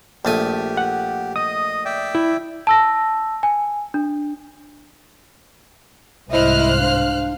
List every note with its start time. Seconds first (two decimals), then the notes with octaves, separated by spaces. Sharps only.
0.25 A#1 A3 G4 G#5
0.77 F#5
1.36 D#5 D#6
1.85 D5 E5 G5
2.15 E4
2.67 A5 E6 A#6
3.43 G#5
3.94 D4
6.31 C2 G#2 E4 C5 D#5 E5 F6 F#6
6.78 D4 F5